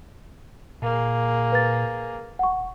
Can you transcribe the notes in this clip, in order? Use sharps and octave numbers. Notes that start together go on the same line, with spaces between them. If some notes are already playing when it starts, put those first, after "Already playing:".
A#2 A#3 G#4
B4 A6
D#1 F#5 C#6